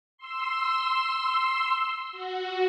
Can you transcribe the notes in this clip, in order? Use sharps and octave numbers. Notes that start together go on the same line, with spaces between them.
C6 E6
F#4